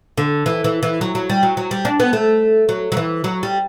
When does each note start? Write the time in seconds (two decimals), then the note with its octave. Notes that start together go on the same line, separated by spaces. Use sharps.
0.18 D3
0.46 E3
0.64 E3
0.83 E3
1.01 F#3
1.15 F#3
1.30 G3
1.43 F#3
1.57 F#3
1.71 G3
1.85 D4
2.00 B3
2.13 A3
2.69 F#3
2.92 F#3
2.97 E3
3.24 F#3
3.43 G3